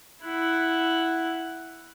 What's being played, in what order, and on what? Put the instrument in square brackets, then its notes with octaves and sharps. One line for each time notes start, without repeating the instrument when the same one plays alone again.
[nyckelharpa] E4 F#5